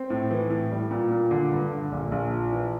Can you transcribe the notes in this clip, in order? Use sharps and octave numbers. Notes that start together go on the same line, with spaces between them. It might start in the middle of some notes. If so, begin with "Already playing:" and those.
Already playing: C4
A2
E3
A2
G3
A#2
A#2
D3
G2
D3
A#1
A#1
F3
E3